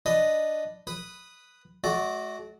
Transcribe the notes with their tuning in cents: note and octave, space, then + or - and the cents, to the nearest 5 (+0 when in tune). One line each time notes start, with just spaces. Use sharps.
D4 +0 B4 +0 D#5 +0
B4 +0 D#6 +0
A3 -45 F#4 +0 D5 -5